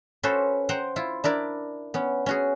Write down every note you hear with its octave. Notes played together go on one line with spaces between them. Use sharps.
C#4 F#4 A4 B4 C5
C5 F#5 G5 A#5
E4 F4
D4 E4 A#4 D5
B3 C#4
C#4 F#4 G#4